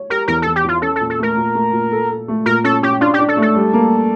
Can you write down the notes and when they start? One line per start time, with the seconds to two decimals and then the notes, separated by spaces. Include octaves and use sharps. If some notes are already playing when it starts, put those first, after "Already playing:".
Already playing: C#5
0.10 G4 A#4
0.28 E2 A#4
0.42 E2 A4
0.56 G4
0.64 E2 F4
0.82 C#4 A4
0.96 A4
1.01 A#2
1.10 A4
1.19 A3 A#4
1.37 A#2
1.55 A3
1.73 A#2
1.92 A4
2.10 A4
2.28 A3
2.46 A#2 A#4
2.64 C#4 A4
2.82 C#4 G4
3.01 D4 F4
3.14 G4
3.19 D4
3.28 A4
3.37 A3
3.42 A4
3.55 G3
3.73 A#3